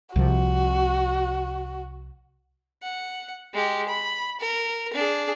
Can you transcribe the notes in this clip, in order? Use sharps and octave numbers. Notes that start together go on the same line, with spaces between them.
C2 C3 F3 F#4
F#5
G#3 G4
B5
A#4
D4 G#4